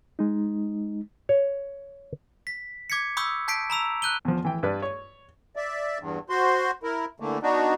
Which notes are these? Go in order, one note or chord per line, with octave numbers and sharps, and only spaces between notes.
G#3 D#4
C#5
B6
D6 G#6 B6 C#7
B5 C#6 D#6 E6 G6
A5 G6 B6 C7 D7
A#5 B5 E6 F7
F#6 G6 D#7 G7
E2 F3
E3 G5
G2 B4 D5
C#5
D5 E5
E2 G2
F#4 C5 C6
E4 A#4
D3 E3 A3 A#3
B3 D4 D#4 F#4